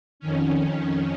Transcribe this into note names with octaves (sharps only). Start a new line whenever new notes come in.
F2 D#3 C#4